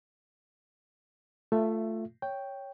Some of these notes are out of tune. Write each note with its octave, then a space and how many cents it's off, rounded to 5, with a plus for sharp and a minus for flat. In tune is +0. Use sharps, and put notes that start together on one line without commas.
A3 +5 F4 +0 E5 +20
C#5 +0 G5 +0